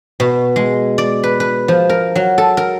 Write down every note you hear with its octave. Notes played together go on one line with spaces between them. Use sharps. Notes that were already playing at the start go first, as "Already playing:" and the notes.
B2
G#3
D5
B4
B4
F3
A#4
F#3
A4
A#4